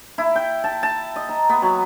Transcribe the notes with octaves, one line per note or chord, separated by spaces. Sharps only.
E4
G5
A5
A5
D#5
A#5
B3
F#3